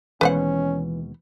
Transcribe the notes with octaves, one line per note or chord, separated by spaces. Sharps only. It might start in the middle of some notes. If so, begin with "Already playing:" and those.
D#2 B2 E3 G#3 C#4 B4 C5 F#5